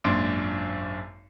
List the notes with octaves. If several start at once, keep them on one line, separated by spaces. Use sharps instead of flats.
G#1 F#2 A#2 D4 C6 D7